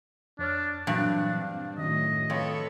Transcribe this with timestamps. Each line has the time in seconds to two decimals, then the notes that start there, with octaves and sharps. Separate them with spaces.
0.39 F2 D4 C#5 F6
0.87 G2 A#2 E3 F#3 C4 D4
1.42 F5
1.78 F#2 A2 D#3 D#5
2.30 F2 A4 B4 C#5